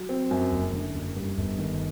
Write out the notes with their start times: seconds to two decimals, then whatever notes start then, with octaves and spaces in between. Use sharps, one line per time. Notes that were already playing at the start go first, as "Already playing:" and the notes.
Already playing: F#3
0.09 C4
0.31 F#2
0.52 F#1
0.73 D3
0.94 F#1
1.16 G2
1.37 G1
1.58 D#3